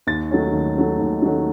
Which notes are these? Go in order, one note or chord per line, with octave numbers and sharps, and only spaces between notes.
D#2 A6
D#3 F#3 A3 C#4
D#2
D#3 F#3 A3 C#4
D#2
D#3 F#3 A3 C#4